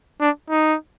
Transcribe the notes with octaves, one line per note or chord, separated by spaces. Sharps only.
D4
D#4